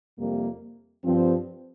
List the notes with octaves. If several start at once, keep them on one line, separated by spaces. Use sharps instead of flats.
F2 C3 G3 A#3
G2 F3 C4